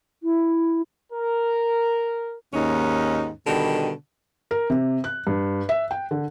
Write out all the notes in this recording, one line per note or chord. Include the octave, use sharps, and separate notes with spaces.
E4
A#4
D#2 G#2 C#4 D#4
B2 D3 D#3 G3
A#4
C3
F#6
G2
E5
G5
D3